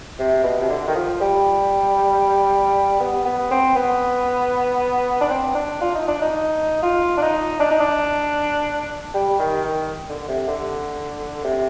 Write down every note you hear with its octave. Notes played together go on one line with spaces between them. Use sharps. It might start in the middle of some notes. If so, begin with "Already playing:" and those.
C3
B2
C3
D3
D#3
F3
G3
B3
B3
C4
B3
D4
C4
D4
F4
D#4
D4
D#4
F4
D4
D#4
D4
D#4
D4
G3
D#3
D#3
D3
C3
D3
C3